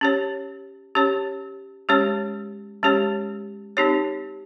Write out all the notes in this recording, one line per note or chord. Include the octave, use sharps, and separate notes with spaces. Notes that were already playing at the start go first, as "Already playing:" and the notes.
C#4 G4 C#5
C#4 G4 C#5
G#3 C#4 G4 C#5
G#3 C#4 G4 C#5
C4 D#4 G4 C#5